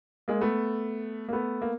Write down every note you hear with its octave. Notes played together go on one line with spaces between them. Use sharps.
G#3 A#3
A3 B3
A#3
A3 B3
A#3